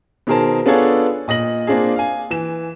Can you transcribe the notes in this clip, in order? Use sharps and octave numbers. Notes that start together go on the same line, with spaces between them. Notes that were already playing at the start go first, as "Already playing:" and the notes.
B2 D#3 G#4 A#4 C5 A5
B3 D4 F4 G#4 A4 C#5
A#2 D#5 A#6 F#7
A#3 C4 D4 F4 G#4
F5 G#5
E3 E7